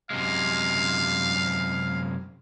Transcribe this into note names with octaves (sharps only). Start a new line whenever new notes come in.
F#2 C3 G#3 F5